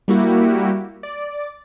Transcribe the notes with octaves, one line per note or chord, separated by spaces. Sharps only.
G3 A#3 E4 F#4 G4
D5